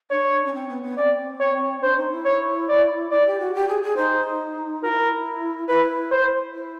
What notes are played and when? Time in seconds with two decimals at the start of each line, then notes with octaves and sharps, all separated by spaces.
0.11 D4 C#5
0.46 C#4
0.54 C4
0.69 B3
0.83 B3
0.97 C#4 D5
1.02 C4
1.40 C#5
1.82 D4 C5
1.97 D#4
2.11 E4
2.25 C#5
2.69 D5
3.11 E4 D5
3.26 G4
3.40 F#4
3.55 G4
3.69 G#4
3.83 G#4
3.97 D#4 C5
4.83 F#4 A#4
4.88 E4
5.68 E4 B4
6.12 C5
6.54 E4